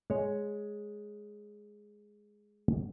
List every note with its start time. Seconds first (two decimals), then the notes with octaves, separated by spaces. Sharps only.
0.10 G#3 C#5